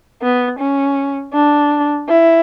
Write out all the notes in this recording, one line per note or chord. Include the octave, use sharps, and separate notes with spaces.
B3
C#4
D4
E4